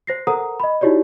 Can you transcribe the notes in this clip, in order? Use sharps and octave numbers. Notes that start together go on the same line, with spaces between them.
C5 A#6 C7
A4 A#4 C5 F#5 A#5 D#6
D#5 B5
D#4 E4 F#4 G4 C#5 D5